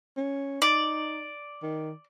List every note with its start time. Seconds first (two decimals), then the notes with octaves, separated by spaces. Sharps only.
0.17 C#4
0.62 D#4 D5
1.63 D#3